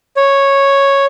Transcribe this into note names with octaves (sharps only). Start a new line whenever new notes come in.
C#5